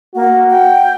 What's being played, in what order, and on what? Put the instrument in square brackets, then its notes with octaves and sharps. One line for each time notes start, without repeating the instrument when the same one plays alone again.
[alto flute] A#3 [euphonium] F#4
[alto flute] G5